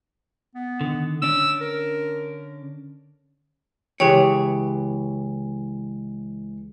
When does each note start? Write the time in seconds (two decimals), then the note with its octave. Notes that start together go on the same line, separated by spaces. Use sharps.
0.55 B3
0.81 D3 D#3
1.22 D3 C#4 D4 E6
1.61 A#4
4.00 C#2 E3 G4 G#4 C#5 G5